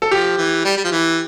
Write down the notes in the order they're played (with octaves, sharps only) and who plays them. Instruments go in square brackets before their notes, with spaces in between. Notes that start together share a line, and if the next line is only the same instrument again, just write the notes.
[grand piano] A4
[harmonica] F3 [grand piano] G4
[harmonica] E3
G3
G3
F3
E3